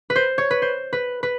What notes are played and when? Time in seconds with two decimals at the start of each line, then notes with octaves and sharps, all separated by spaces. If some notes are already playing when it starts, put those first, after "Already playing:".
0.10 B4
0.16 C5
0.38 C#5
0.51 B4
0.62 C5
0.93 B4
1.23 B4